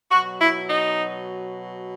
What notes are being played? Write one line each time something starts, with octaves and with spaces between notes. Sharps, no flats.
B2 F#3 F#4
E4
D#4